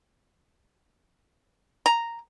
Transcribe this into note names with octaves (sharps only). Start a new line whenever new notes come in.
A#5